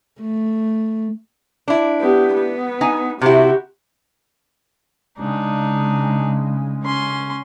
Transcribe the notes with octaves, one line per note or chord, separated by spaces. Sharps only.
A3
D4 E4
B3 G4
B3
D#4 G#5
C3 C4 E4 F#4 G4
C#3 G#3 D4 D#4
C#4 C6